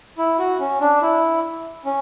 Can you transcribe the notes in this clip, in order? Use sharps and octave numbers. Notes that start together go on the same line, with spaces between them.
E4
F#4
C#4
D4
E4
C#4